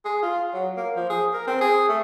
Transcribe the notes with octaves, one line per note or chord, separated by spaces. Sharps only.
G#4
F4
F#3
A#3
F3
G#4
A#4
C4
G#4
A3